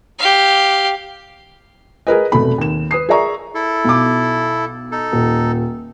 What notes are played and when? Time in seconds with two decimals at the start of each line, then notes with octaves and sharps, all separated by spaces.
0.19 G4 F5
2.07 G#4 A#4 B4 D#5
2.32 F1 B2 A3 B5
2.58 D#2 E7
2.91 B4 D#6 C7
3.09 G#4 A#4 D5 E5 A#5 C#6
3.54 E4 A4
3.85 B1 D6
4.92 D#4 A4
5.12 D#1